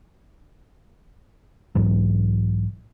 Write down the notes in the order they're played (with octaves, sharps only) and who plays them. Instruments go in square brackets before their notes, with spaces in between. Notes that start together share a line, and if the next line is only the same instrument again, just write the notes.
[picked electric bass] B1 G#2 E3 F#3